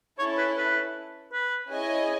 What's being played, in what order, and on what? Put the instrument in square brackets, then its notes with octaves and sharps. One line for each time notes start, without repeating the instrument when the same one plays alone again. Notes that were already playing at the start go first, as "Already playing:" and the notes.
[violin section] C#4 E4 A4 [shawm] C#5
[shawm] B4
B4
B4
[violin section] C#4 E4 G#4 D#5 G#5